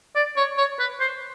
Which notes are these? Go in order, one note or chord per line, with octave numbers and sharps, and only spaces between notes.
D5
C#5
C#5
B4
C5